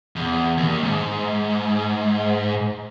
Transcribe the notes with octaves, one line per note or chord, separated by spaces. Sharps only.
E2
D#2
G#2